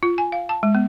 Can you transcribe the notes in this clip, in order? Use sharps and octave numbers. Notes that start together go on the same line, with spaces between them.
F4
G#5
F5
A5
G#3
B3